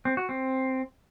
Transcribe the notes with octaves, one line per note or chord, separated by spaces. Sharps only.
C4
F#4
C4